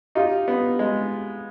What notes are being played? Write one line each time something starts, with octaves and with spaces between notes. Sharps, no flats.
D#4 F4 G4
B3
G#3